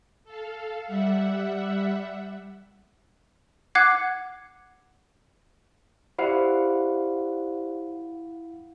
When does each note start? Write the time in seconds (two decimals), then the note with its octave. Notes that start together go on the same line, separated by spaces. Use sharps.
0.24 A4 F5
0.87 G3 E5 F#5
3.75 F#5 D6 F#6 G#6 C7
6.18 E4 G4 C5 D5 F5 F#5